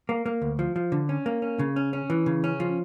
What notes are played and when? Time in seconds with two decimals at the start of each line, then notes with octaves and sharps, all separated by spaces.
0.09 A#3
0.26 A#3
0.42 D2
0.59 F3
0.76 F3
0.92 D3
1.09 C#4
1.26 A#3
1.42 C#4
1.59 C#3
1.76 C#4
1.93 C#4
2.10 E3
2.26 C#3
2.44 C#4
2.60 F3